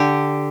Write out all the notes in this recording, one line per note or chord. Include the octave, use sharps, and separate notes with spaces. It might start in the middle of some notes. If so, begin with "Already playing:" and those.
Already playing: D3 G4